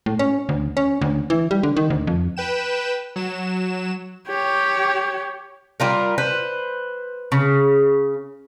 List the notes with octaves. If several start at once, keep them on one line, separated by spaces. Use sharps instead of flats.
A2
C#4
D2
C#4
D2
E3
G3
D3
D#3
D2
F2
B4 G5 E7
F#3 E7
G4 C#5
G3 F4 A#4
B4 C5
C#3